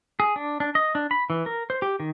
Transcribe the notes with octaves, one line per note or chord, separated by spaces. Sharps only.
G#4
D4
D4
D#5
D4
B5
E3
A#4
C5
G4
D#3